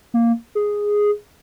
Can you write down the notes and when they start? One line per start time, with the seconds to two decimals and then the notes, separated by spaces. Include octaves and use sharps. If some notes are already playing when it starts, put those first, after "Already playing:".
0.14 A#3
0.55 G#4